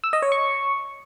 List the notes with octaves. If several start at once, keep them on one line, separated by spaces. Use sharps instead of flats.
E6
D#5
C#5
C#6